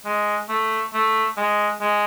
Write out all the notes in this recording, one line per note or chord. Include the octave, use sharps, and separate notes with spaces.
G#3
A3
A3
G#3
G#3